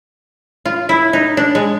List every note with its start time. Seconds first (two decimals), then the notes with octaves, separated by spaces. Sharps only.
0.66 F4
0.89 E4
1.13 D#4
1.37 D4
1.55 G#3